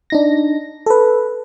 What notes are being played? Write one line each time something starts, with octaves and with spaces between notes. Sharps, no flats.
D4 D#4 A#6
A4 B4